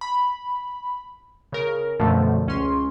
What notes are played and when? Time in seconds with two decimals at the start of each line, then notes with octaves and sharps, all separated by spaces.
0.01 B5
1.52 C#3 A#4
2.00 F#2 B2 D3 F3 A3
2.47 C#2 C#4 C6